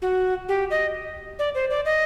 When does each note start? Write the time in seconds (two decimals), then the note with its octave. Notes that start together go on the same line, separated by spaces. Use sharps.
0.02 F#4
0.49 G4
0.70 D#5
1.39 D5
1.55 C5
1.70 D5
1.85 D#5